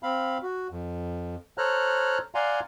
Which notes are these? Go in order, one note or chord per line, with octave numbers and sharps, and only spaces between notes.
C4 F5 B5
F#4
F2
A4 C5 C#5 A#5 F6 F#6
D5 F5 F#5 G#5 A#5 C6